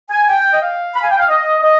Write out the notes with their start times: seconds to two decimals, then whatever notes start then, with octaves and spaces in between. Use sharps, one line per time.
0.11 G#5
0.28 G5
0.53 D#5
0.62 F5
0.94 B5
1.03 G#5
1.11 G5
1.19 F5
1.29 D#5
1.62 D#5